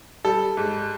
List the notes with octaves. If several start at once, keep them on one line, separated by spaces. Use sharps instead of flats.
G3 A4
G#2